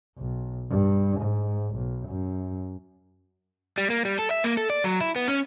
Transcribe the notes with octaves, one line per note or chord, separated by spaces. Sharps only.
B1
G2
G#2
B1
F#2
G3
A#3
G3
A4
E5
A#3
A4
D5
F#3
E4
B3
C#4